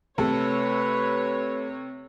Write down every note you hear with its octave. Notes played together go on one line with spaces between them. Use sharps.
C3 A3 A4 B4 C#5